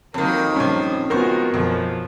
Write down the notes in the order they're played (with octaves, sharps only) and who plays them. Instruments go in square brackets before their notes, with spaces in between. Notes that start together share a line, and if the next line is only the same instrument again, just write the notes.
[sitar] F2 D#3 [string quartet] F#3 A#3
[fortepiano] A#1 G2 [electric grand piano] C#4 [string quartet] C5
[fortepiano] C#2 C5 C#6 [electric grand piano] B3 A#4 [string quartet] F4 F#4 G#4
[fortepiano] B1 [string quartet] F#2 F3